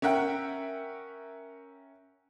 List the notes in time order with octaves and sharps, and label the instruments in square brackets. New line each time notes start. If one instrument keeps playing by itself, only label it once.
[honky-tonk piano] C#4 A#4 E5 F#5 G5